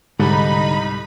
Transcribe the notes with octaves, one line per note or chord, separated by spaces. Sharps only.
C2 G#2 D3 D#4 B5